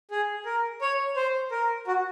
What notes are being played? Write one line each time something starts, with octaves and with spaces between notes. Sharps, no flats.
G#4
A#4
C#5
C5
A#4
F#4